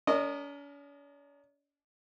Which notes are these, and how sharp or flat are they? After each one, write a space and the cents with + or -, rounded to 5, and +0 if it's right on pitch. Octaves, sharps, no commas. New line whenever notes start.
C#4 +45 A#4 -15 D#5 -25